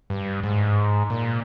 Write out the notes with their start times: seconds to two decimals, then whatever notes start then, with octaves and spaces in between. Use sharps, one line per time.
0.10 G2
0.43 G#2
1.10 A#2